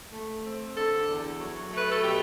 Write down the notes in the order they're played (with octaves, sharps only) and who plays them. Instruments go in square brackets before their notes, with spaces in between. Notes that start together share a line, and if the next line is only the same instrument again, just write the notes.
[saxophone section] A3
C4
D3 A4
E2
F#3
A3
B4
A4
B2 G4